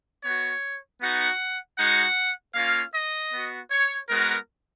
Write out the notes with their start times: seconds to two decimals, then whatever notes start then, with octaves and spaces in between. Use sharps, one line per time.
0.24 B3 F#4 C#5
1.01 B3 D#4 F#4 F#5
1.78 G#3 D#4 F#4 F#5
2.55 A#3 C#4 F4 F5
2.94 D#5
3.32 B3 F#4
3.71 C#5
4.09 G#3 B3 F#4 A#4